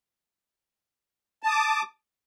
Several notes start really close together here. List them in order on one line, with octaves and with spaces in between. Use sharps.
A5 D#6 D6